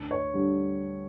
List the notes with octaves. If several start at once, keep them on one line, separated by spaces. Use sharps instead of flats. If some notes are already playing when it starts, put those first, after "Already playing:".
Already playing: D2
C#5
D3 G3